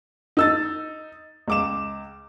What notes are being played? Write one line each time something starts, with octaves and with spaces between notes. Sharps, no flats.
D#4 E6 A6
C#2 D6 E7